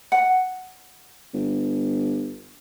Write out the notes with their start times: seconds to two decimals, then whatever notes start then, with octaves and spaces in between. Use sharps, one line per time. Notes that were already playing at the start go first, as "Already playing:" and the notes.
0.12 F#5
1.33 G1